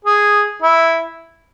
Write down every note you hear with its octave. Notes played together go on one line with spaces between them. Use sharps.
G#4
E4